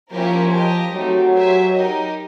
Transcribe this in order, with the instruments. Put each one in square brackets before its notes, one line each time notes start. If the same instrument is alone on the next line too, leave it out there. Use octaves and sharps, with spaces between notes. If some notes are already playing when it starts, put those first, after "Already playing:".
[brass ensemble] F3 [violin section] A#3 C#4 E4 G4 A#4
[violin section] G4 A#4 D#5
[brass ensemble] F#3 [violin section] A3 C4 D#4 G4
[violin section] G4 C5 E5 G#5
D#4 G4 A#4 D#5